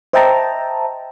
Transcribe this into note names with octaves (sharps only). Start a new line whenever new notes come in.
C5 D#5 E5 G5 A5 A#5